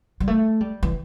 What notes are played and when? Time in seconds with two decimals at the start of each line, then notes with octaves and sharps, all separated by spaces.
0.20 G3
0.28 A3
0.61 G3
0.83 E3